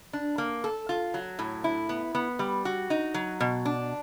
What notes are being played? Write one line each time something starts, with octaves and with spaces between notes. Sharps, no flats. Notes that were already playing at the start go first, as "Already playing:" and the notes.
D4
A#3
A4
F4
F#3
A2
E4
B3
B3
G3
F#4
D#4
F#3
B2
D4